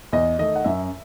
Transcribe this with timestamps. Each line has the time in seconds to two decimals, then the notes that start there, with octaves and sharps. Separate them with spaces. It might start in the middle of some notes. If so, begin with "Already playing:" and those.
0.13 E2 D#5
0.39 D#3 A3 D#4 D#5
0.55 F#5
0.64 F#2 E5